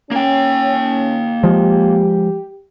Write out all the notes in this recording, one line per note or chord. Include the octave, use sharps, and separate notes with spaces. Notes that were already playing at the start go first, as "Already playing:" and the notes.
A#3 C#4 G5
F3 G#3 G4